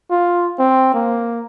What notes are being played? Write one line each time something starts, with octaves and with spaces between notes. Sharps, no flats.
F4
C4
A#3